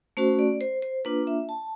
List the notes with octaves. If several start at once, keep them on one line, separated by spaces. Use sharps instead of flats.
A3 C#4 F#4 C5
D5
C5
C5
A#3 D4 F4 B4
E5
A5